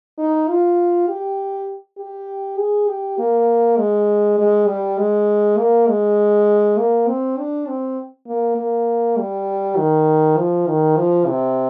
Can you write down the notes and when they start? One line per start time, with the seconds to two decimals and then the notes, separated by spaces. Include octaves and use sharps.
0.18 D#4
0.49 F4
1.08 G4
1.98 G4
2.58 G#4
2.88 G4
3.18 A#3
3.78 G#3
4.39 G#3
4.67 G3
4.98 G#3
5.58 A#3
5.88 G#3
6.78 A#3
7.08 C4
7.38 D4
7.67 C4
8.27 A#3
8.57 A#3
9.18 G3
9.77 D#3
10.38 F3
10.67 D#3
10.97 F3
11.27 C3